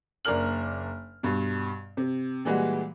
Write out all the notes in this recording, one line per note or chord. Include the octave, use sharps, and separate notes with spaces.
F#1 A#3 D4 A#4 F6 F#7
G2 B2
C3
A#2 E3 G3 G#3 F#4